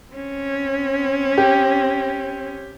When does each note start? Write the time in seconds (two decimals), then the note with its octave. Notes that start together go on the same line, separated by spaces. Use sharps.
0.13 C4 C#4
1.38 G4